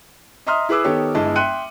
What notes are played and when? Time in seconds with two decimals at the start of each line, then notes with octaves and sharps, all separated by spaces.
0.47 D#5 E5 A#5 C6 D#6 F6
0.69 E4 G#4 B4 D6 E6
0.84 D#3 B3 G4 A4 C#5
1.15 G1 G#3 E4 D#5 A5
1.36 E5 G5 C6 F#6 C#7 D#7